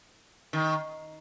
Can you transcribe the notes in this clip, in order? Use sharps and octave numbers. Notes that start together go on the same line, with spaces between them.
D#3